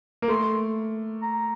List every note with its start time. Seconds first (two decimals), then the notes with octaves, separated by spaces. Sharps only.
0.22 A#3
0.28 A3 C6
1.22 A#5